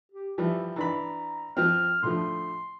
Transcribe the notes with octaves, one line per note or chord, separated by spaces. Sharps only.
G4
E3 F3 G3 E5
E3 D4 A#5 B5
F3 C4 F6
A2 D3 F3 C6